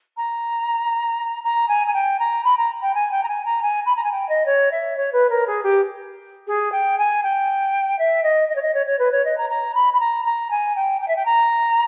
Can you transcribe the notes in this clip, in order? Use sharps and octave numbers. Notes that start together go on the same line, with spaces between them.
A#5
A#5
G#5
G#5
G5
A#5
B5
A#5
G5
G#5
G5
A#5
G#5
A#5
G#5
B5
A#5
G#5
G5
D#5
C#5
E5
C#5
B4
A#4
G#4
G4
G#4
G5
G#5
G5
E5
D#5
D#5
C#5
D#5
C#5
C#5
B4
C#5
D#5
A#5
A#5
B5
B5
A#5
A#5
G#5
G5
G5
E5
G5
A#5